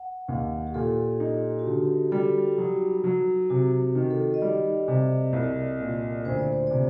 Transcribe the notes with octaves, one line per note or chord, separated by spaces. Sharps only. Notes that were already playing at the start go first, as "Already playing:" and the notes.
Already playing: F#5
D#2
G4
A#2 A4
D#4
F#4
D3 G4
G3 A4
F#3 D#4
F#3
C3 F#4
D#3
A4
D#5
G3 D5
C3
C2
A#2
D2 C5
D5
C5
C3 D5